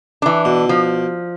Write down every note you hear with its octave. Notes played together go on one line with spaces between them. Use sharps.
E3 D4
B2
F3